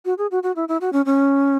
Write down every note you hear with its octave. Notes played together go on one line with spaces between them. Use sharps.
F#4
G#4
F#4
F#4
E4
E4
F#4
C#4
C#4